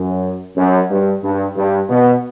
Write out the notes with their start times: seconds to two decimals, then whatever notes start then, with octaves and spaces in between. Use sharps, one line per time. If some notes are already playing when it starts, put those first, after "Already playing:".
Already playing: F#2
0.56 F#2
0.90 G2
1.23 G2
1.57 G2
1.89 B2